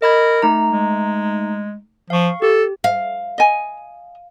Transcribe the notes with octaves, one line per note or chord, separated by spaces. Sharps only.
A#4 D#5 B5 G#6
A3 D#4 A#5
G#3
F3 F5 C#6
G4 A4
F5
D#5 G#5